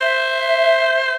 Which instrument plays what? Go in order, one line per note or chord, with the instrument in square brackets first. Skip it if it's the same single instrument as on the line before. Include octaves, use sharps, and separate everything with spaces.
[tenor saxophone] C5 [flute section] E5